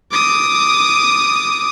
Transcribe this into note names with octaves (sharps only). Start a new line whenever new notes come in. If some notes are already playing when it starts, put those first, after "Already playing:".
D6 D#6